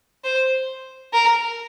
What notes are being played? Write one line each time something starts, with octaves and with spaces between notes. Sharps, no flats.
C5
A#4